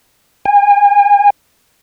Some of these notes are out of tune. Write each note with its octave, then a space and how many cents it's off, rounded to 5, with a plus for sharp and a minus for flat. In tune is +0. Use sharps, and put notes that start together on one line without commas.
G#5 -35